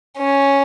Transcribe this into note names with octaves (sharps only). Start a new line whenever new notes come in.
C#4